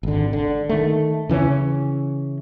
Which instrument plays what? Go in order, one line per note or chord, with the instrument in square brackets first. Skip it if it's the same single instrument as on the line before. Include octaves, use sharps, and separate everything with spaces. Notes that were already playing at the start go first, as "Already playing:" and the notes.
[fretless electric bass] G#1 D3
D3
D#3 A3
C#3 E3 C4 C#4